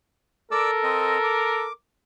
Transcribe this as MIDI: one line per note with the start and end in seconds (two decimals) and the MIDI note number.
0.52 1.67 69
0.52 1.70 70
0.52 0.71 74
0.52 0.71 86
0.52 0.71 88
0.83 1.18 60
0.83 1.18 75
1.24 1.73 86